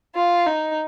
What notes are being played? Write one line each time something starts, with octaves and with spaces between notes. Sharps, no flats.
F4
D#4